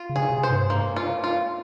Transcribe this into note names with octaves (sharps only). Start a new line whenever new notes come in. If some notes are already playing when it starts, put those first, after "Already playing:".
Already playing: F4
C#3
G#4
C3
C5
G2
A#3
F4
F4